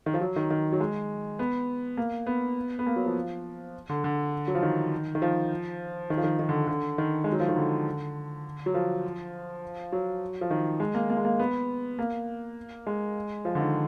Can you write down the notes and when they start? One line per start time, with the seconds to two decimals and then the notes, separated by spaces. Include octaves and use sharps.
0.06 D#3
0.14 F3
0.21 F#3
0.36 D#3
0.50 D#3
0.72 F#3
0.80 G#3
1.39 B3
1.97 A#3
2.26 B3
2.79 B3
2.86 A#3
2.96 F#3
3.06 F3
3.89 D3
4.04 D3
4.48 F#3
4.55 F3
4.62 D#3
5.15 D#3
5.22 F3
6.10 D#3
6.17 F3
6.24 D#3
6.39 D#3
6.49 D3
6.68 D3
6.98 D#3
7.24 G#3
7.32 F#3
7.40 F3
7.49 D#3
7.56 D3
8.66 F#3
8.74 F3
9.92 F#3
10.41 F3
10.51 D#3
10.80 G#3
10.95 A#3
11.10 A#3
11.17 G#3
11.25 A#3
11.39 B3
11.99 A#3
12.87 G#3
13.45 F3
13.55 D3
13.61 D#3